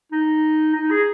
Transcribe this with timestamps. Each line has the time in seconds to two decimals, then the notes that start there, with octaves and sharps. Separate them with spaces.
0.12 D#4
0.75 D#4
0.91 G#4